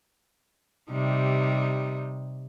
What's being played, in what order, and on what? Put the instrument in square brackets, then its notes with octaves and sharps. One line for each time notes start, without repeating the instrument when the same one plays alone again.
[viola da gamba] C3 G3 D#4